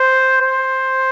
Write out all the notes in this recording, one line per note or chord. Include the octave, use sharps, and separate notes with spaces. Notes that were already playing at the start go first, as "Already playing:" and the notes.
Already playing: C5
C5